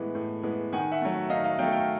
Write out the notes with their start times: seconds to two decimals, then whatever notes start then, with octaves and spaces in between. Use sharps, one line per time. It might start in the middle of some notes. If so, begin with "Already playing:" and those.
Already playing: A2 E3 G#3 B3
0.15 A2
0.43 E3 G#3 B3
0.73 D#3 F#5 G#5
0.92 E5 F#5
1.02 F#3 A3
1.30 D#3 D#5 F5
1.44 D#5 F5
1.58 F#3 A3 F5 G5
1.73 F5 G5